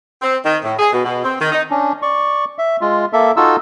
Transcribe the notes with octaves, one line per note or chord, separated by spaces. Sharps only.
C4
D#3
A2
G#4
B2
B2
C4
D#3
D#4
C#4 D4
D5 C#6
E5
G#3 F4
A#3 A4 E5
D#4 F4 F#4 A4 E6